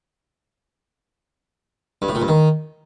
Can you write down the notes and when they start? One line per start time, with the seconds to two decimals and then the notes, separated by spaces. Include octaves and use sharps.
2.02 G2
2.09 A2
2.15 A#2
2.22 G2
2.28 D#3